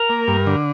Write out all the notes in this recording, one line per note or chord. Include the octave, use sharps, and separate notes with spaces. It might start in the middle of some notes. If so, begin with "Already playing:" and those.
Already playing: A#4
A#3
G2
D3